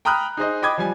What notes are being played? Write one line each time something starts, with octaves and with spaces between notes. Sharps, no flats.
G5 A#5 B5 D#6 F6 F#6
D#4 G#4 C5 D#5
D#5 G5 B5 D6 D#6 G#6
F3 G3 G#5